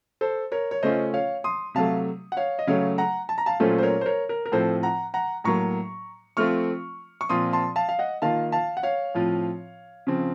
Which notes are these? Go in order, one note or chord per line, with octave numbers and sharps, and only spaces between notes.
A4 C5
A#4 C#5
C#5
C#3 A3 C#4 F4 C5 D#5
C#5 F5
C6 D#6
C3 F#3 A3 F5 A5
F#5
C#5 F5
D#5
C#3 F#3 A3 C#5 F5
F#5 A#5
A5
A#5
F5 A5
A#2 F#3 A3 C#4 F4 A4 C5
C5
A#4 C#5
C5
A#4 C#5
A#4
A#4
A2 F3 C4 A4 C5
F#5 A#5
F#5 A#5
A2 F#3 A#3 A#5 C#6
F3 A3 C4 F4 C#6 F6
C#6
A#2 F3 C4 F4 C6 D#6
A5 C6
F5 A5
F5
D#5 F#5
D#3 A#3 F4 F5 A5
F5 A5
F#5
C#5 F5
A2 F3 C4 F4
C#3 F3 C4